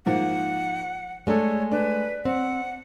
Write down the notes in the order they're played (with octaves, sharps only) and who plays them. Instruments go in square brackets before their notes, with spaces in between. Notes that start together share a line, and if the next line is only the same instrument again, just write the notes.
[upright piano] G#2 F3 A#3 [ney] F#5
[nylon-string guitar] G#3 A3 [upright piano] D4 A4 [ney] C#5
[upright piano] D4 [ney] B4
[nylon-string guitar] C4 [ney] F#5